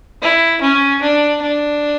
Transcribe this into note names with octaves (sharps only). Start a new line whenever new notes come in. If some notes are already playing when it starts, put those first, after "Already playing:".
E4
C#4
D4
D4